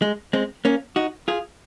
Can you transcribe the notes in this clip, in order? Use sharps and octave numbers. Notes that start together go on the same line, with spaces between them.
G#3
G#3 C4
A#3 C#4
D#4 F#4
F4 G#4